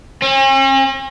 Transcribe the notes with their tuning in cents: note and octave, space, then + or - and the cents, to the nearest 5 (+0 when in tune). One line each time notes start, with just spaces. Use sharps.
C#4 -45